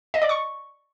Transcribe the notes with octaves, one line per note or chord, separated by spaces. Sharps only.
D#5
D5
C#6